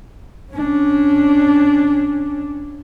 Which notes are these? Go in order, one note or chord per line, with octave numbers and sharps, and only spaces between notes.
C#4 D4